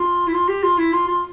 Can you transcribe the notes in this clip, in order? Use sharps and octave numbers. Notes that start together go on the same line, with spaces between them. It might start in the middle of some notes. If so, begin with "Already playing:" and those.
Already playing: F4
E4
F4
G4
F4
E4
F4
F4